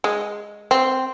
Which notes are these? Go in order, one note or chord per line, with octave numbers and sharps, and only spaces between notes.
G#3
C4